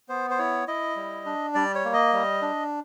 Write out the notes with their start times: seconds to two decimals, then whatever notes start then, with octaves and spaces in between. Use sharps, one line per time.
0.09 B3 C5
0.30 C5
0.38 E4 C#5
0.68 E4 D#5
0.96 G3
1.26 D4
1.55 G3 D5
1.75 C#5
1.85 A#3
1.93 D#5
2.13 G3
2.42 D4